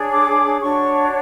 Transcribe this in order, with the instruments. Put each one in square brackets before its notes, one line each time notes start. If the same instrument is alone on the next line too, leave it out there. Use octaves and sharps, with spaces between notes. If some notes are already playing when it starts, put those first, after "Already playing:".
Already playing: [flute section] D4 G#4 C#5
D6
D4 F#4 C#5 C#6